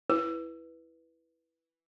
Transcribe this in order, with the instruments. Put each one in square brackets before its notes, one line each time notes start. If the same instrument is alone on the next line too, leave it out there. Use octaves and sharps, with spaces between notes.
[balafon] E4 [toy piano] B4